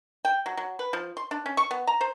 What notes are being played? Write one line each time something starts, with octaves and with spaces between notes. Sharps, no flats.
G5
F#3
F#3
B4
F3
C6
D4
C#4
C#6
B3
A#5
C5